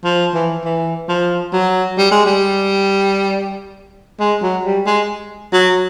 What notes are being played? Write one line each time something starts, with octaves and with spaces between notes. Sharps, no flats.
F3
E3
E3
F3
F#3
G3
G#3
G3
G#3
F#3
G3
G#3
F#3